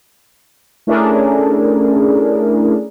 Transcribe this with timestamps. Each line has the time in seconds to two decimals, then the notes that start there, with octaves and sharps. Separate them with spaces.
0.87 A3 C#4 D4 E4 G#4 A#4